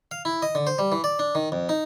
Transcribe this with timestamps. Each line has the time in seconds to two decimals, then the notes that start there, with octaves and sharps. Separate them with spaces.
0.11 F5
0.25 E4
0.42 D#5
0.55 D3
0.67 C5
0.79 G3
0.92 E3
1.04 D5
1.19 D4
1.35 D#3
1.52 F2
1.69 D#4